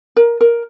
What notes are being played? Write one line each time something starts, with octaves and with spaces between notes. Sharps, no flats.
A#4
A#4